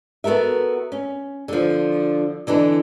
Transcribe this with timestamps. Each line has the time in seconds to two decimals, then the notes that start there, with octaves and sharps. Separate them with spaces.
0.24 B3 F#4 A4 A#4 E5
0.92 C#4
1.48 D3 F3
2.47 D3 E3 D4 D#4